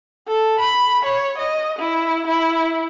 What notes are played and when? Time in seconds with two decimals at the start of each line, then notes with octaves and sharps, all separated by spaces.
0.27 A4
0.60 B5
1.05 C#5
1.38 D#5
1.79 E4
2.27 E4